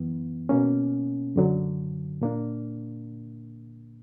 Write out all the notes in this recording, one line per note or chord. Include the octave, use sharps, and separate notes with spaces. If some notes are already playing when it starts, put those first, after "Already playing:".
Already playing: F#2 E3 B3
B2 A#3 C#4
F#2 D3 F#3
A#2 A#3 D4